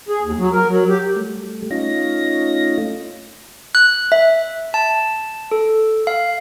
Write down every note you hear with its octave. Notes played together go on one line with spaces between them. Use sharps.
G#4
D#2
F#3
A#4
F#3
G4
G3 A3
A3 C#4 D#4 F4 A#6
F#6
E5
A5
A4
F5